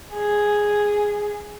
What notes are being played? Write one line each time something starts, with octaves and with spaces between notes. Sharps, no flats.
G#4